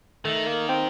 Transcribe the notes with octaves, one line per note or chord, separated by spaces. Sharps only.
D#3 A3
A#3
C4